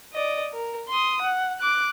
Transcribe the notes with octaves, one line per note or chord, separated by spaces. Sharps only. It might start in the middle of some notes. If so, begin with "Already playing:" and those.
D5 D#5
A#4
C6 D#6
F#5
D6 F#6